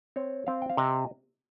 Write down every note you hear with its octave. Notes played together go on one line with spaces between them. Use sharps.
C4 C#5
C4 F5
G5
F5
C3 D#5